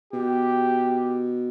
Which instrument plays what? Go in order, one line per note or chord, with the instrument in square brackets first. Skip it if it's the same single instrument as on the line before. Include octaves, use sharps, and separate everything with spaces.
[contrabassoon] B2 [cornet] G4